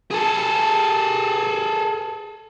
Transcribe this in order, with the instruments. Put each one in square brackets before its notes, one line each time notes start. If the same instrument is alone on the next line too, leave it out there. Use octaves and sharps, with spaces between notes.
[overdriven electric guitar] G#4 A4